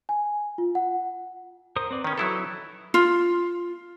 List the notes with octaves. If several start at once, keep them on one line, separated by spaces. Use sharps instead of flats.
G#5
F4
F#5
A#4 C5 D#6
C4 B4 D5
D#3 C#4 D#4 B4 D#5
F#3 E4 A4
F4